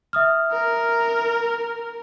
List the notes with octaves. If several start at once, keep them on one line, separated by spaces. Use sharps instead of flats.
E5 D#6 F6
A#4